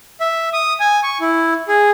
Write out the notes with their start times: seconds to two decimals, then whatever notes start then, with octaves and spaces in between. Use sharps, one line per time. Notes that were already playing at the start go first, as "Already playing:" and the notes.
0.20 E5
0.53 D#6
0.80 G#5
1.03 C#6
1.20 E4
1.68 G#4